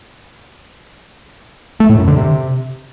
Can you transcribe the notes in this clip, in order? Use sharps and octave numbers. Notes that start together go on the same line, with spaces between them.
A3
A2
F#2
D3
C3